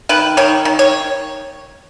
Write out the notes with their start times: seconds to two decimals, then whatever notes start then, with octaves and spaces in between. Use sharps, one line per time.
0.09 D#3 B4
0.37 D#3 C#5
0.65 D#3
0.79 C#5